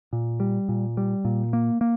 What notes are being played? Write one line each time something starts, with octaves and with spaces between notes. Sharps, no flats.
A#2
G3
A#2
G3
A#2
A#3
A#3